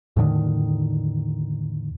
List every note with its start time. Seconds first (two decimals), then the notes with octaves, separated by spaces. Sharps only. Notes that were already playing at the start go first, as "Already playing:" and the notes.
0.16 E2 A2 D3 D#3